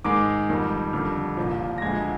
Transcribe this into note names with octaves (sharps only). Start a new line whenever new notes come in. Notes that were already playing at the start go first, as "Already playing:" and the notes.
G#2 D#3 G#3 D6
F2 D#3 G3
F2 D3 G3 F6
C2 A#2 F3
A#6
D2 D3 F3 G#3 G#6